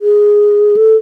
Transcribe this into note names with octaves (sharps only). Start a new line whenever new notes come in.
G#4
A4